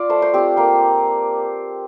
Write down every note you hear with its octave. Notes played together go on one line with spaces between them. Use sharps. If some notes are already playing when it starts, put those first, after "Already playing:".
Already playing: F4 D5
A3 C5
C5
C4 F4 G4
A#3 C5